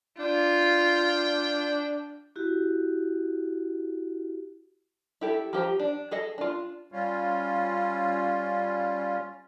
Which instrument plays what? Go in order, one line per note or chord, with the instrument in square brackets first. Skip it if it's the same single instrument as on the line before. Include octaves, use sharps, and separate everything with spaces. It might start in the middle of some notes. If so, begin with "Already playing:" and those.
[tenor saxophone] D4 [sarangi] F4 [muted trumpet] G5
[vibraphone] E4 F#4 G4
[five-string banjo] E4 G4 A4
F3 G4 C5 A#5
D4
G#4 A4 D#5
D4 F4
[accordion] G3 C#4 F4